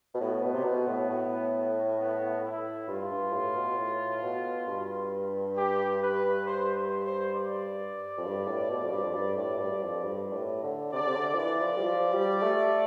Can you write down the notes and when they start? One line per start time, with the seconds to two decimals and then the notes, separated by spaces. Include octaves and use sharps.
0.14 B2
0.20 A2 B3
0.43 B2
0.54 C3
0.64 B2
0.87 A2
1.10 A2
2.00 B3
2.44 E4
2.88 G2 F4
3.11 G2
3.33 A2
3.55 B2
3.78 A2
4.22 B2
4.67 G2
5.57 G4
6.02 B4
6.46 C5
6.76 C5
7.06 C5
7.35 D5
8.18 F2
8.25 G2
8.48 A2
8.70 B2
8.83 F2
8.92 G2
9.03 F2
9.14 G2
9.37 A2
9.59 G2
9.72 G2
9.82 F2
10.04 G2
10.33 A2
10.63 D3
10.93 C3 D5
11.00 D3
11.07 C3
11.15 D3
11.34 F3
11.38 E3 D5
11.60 F3
11.77 G3
11.83 F3
12.13 G3
12.43 A3